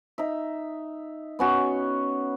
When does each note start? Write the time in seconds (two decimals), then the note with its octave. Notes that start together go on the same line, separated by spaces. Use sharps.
0.18 D#4 E5
1.39 B3 C#4 F#4